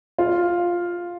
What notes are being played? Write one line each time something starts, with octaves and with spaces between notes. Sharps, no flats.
F4